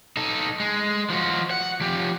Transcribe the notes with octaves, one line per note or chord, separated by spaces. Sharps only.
D#4 A4
G#3
F3 F#4
F#5
F3 G4